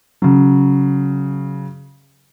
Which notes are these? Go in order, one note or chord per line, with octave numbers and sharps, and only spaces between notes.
C#3 F#3